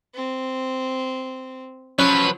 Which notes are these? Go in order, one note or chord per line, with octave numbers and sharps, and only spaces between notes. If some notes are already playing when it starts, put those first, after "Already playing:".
C4
F3 F#3 C#4 B4